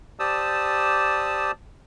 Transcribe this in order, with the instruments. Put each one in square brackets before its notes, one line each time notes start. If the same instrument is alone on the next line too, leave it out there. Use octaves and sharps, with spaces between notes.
[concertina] G4 C5 D5 A5 D#6 E6